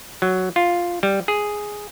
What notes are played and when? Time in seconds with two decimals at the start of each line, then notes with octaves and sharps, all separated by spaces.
0.22 F#3
0.56 F4
1.03 G3
1.28 G#4